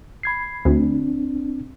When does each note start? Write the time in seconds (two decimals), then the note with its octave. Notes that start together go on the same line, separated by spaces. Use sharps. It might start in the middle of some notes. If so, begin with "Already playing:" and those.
0.23 B5 G#6 C7
0.65 D2 C4 D4